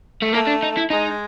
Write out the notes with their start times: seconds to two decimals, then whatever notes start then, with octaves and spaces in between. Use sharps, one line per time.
0.22 A3
0.33 A3 A#3
0.47 D4
0.63 D#4
0.77 E4
0.90 G#3 D#4